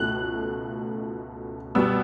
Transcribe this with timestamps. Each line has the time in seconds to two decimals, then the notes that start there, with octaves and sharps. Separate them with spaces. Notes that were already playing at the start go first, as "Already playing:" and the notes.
Already playing: C#2 B2 A3 F#6
1.75 B2 G3 B3 E6